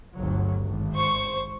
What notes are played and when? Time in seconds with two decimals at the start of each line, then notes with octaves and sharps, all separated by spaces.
0.15 G1 D2 F#3
0.63 G#1
0.95 C5 C#6